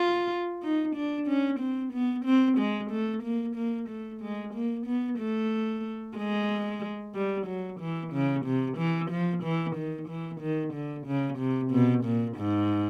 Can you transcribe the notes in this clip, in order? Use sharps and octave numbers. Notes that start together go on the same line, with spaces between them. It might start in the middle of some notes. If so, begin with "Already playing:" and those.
Already playing: F4
D#4
D4
C#4
C4
B3
C4
G#3
A3
A#3
A#3
A3
G#3
A#3
B3
A3
G#3
G3
F#3
E3
C#3
C3
E3
F3
E3
D#3
E3
D#3
D3
C#3
C3
B2
A#2
G#2